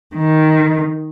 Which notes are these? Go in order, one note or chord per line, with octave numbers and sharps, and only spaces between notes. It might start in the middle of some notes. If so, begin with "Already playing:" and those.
D#3